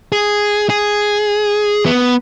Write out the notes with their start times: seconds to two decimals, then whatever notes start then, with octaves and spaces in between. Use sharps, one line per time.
0.12 G#4
0.70 G#4
1.86 B3